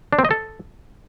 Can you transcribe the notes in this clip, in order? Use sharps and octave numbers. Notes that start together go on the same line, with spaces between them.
D4
C4
D#5
A4